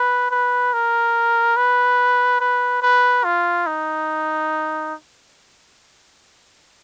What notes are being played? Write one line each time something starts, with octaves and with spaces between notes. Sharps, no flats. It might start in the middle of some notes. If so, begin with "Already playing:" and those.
Already playing: B4
B4
A#4
B4
B4
B4
F4
D#4